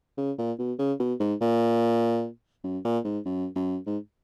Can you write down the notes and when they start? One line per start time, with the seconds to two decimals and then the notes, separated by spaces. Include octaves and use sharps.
0.17 C#3
0.38 A#2
0.58 B2
0.79 C#3
1.00 B2
1.20 G#2
1.41 A#2
2.64 F#2
2.84 A#2
3.04 G#2
3.25 F#2
3.56 F#2
3.87 G#2